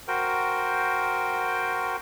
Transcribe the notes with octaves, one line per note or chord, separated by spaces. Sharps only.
F#4 A#4 C5 G5